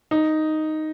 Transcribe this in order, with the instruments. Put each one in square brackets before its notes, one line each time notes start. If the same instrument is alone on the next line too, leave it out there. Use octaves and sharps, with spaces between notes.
[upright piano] D#4